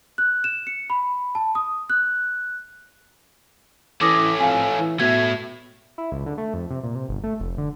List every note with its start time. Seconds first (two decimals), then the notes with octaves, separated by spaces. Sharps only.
0.18 F#6
0.44 E7
0.67 C#7
0.90 B5
1.35 A5
1.55 D#6
1.90 F#6
4.01 E3 A3 C#4 D6 D#6 A#6
4.40 F2 F5 G#5
4.79 E3
5.00 B2 A3 E4 G#6
5.98 E4
6.12 C#2
6.26 D3
6.38 A3
6.54 F2
6.70 C3
6.83 A#2
6.95 C3
7.09 G1
7.24 A3
7.40 F1
7.58 D3